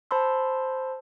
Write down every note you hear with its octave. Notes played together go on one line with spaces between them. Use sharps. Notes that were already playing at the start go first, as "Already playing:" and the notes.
C5 A5 B5 C6 E6